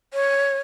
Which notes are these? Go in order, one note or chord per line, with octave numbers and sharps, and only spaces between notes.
C#5